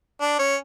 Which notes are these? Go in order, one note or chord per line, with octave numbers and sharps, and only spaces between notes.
D4
C#4